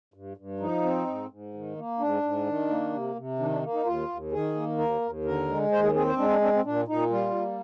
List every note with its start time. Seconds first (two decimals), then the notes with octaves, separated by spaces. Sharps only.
0.14 G2
0.37 G2
0.60 F3 D#4
0.83 C4
1.07 G#2
1.30 G#2
1.54 D#3
1.76 A#3
1.99 G#2 D4
2.23 G#2
2.46 D#3
2.69 A#3
2.92 C3
3.15 C3
3.39 D#3 D4
3.50 D4
3.62 A#3
3.74 D#4
3.85 D#2 F4
4.09 D#2
4.32 D#3 G#4
4.55 A#3
4.78 D#2 A#4
5.01 D#2
5.25 D3 A#4
5.48 G#3
5.72 D#2 C5
5.83 G#4
5.94 C4 G#4
6.07 C5
6.17 G#3 D4
6.29 D4
6.41 C4 D4
6.53 C4
6.64 A#2 D4
6.88 A#2 D#4
7.10 G3 F4
7.35 A#3